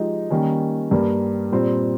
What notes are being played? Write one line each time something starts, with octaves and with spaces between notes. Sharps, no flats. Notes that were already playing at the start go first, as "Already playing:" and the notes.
Already playing: F3 G#3 D#4 G4
D#3 G3 A#3 C#4
G2 G3 A#3
A#2 G3 C4